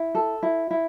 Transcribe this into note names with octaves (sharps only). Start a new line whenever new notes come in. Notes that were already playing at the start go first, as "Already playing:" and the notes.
Already playing: E4
A4
E4
E4